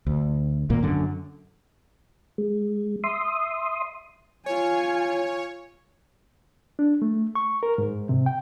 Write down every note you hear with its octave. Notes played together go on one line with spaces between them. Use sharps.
D2
G#1 A#2 A#3
F#2 D3
G#3
E5 C6 D#6
F4 C#5 G#5
D4
A3
C#6
A#4
G#2
C3
G5